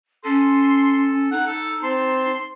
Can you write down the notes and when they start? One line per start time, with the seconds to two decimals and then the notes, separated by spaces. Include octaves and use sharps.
0.25 C#4 A4 C6
1.32 D#4 F#5
1.47 A4
1.83 C4 A5 C6